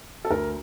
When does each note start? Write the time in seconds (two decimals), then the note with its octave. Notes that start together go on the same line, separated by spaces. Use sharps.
0.25 A4
0.30 D2 A#4